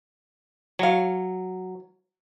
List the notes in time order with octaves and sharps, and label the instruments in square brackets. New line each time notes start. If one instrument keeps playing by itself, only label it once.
[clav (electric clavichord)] F#3 [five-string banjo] C#5 F5